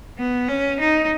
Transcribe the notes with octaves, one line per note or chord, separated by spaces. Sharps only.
B3
C#4
D#4